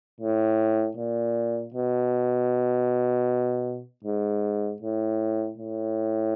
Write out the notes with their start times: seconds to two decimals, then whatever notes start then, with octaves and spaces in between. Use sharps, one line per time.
0.21 A2
0.96 A#2
1.74 B2
4.04 G#2
4.82 A2
5.58 A2